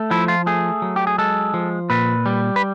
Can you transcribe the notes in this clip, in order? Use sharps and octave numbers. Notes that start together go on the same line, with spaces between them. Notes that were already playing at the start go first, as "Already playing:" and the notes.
Already playing: A3
F3 E4
F4
A3 G#4
F#3
G4
G#4
G#3 A4
F3
A#2 B4
G3
B4